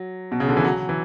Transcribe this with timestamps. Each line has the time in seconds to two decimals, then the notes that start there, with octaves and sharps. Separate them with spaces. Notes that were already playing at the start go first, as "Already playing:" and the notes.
Already playing: F#3
0.32 B2
0.40 C#3
0.49 D3
0.57 E3
0.64 F#3
0.89 E3